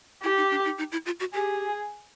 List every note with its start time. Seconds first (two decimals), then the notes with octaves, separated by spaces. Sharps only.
0.23 E4 G4
0.37 D#4
0.51 D4
0.65 D#4
0.78 D#4
0.92 E4
1.06 F4
1.20 F#4
1.33 G4 G#4